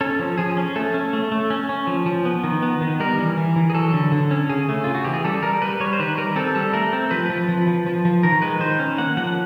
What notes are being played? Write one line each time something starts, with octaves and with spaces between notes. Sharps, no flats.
C#4 A4
F3
F3 G#4
C#4
A3 A4
C#4
A3
A3
C#4
C#4
F3
F3
B3
D#3
B3
D#3
G3 A#4
E3
E3
E3
G#4
F#3 A4
D3
D3
C#4
C#3 G#4
A3
C#3 F4
F#4
E3 G4
G#4
G3 A4
G3 A#4
G3 B4
G3 C#5
C5
D#3 B4
G3 A#4
C4 A4
G3 A4
A3 A#4
C4
F3 B4
F3
F3
F3
F3
F3
D#3 A#4
G#3 B4
D#3 C5
C#4
A#3 F#5
F3 F#5